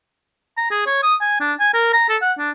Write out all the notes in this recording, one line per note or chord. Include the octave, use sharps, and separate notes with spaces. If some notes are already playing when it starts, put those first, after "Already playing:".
A#5
G#4
C#5
D#6
G#5
D4
G#5
A#4
A#5
A4
F#5
D4